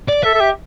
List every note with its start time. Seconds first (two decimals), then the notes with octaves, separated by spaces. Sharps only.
0.09 D5
0.24 A4 E5
0.35 A4
0.40 G4